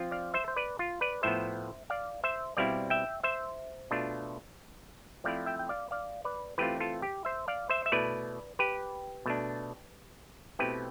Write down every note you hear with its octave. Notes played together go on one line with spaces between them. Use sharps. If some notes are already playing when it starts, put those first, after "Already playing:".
Already playing: F3 C4 F4
D5 F5
C5 E5
C5
B4 D5
F4
B4 D5
A2 F3 B3 C5 E5
D5 F5
C5 E5
B2 G3 C4 E4 D5 F5
E5 G5
C5 E5
B2 A3 D4 F4
F3 A3 C4 E4 D5 F5
E5 G5
G5
D5 F5
D5 F5
B4 D5
E3 A3 C4 F4 G4 B4
F4 A4
G4
C5 E5
D5 F5
C5 E5
E5
B2 A3 E4 B4 D5
G4 B4
B2 A3 D4
B2 A3 C4 E4 G4 B4